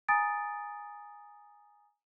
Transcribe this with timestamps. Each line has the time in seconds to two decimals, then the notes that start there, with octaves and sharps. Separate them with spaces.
0.08 G#5 A#5 D#6 A6 D7